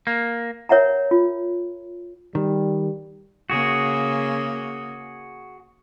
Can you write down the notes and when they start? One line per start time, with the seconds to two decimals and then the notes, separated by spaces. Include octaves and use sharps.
0.07 A#3
0.69 A#4 C#5 E5 F#5 A#5
1.11 F4
2.35 D#3 G3
3.50 C#3 A#3 F#4 G#4